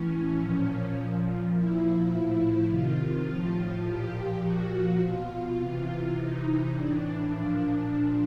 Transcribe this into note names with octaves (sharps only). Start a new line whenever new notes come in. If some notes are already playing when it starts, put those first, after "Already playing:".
Already playing: A2 E3 C#4
A#2 F3
A#2 F3
A#2 F3 E4
A2 F3
C3 D#3 F4
A2 F3
A#2 F3 G4
A#2 F3 F#4
B2 F4
C3 E3 F4
C3 E3 D#4
A2 E3 D4
A#2 F3
A#2 F3